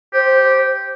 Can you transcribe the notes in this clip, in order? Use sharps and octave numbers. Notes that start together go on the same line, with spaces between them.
G4 C5